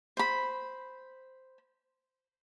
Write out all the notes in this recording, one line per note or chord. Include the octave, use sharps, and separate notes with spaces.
C5 B5